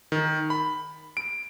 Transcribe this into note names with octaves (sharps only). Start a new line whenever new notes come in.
D#3
B5
D7